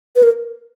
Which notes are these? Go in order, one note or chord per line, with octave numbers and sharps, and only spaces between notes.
B4
A#4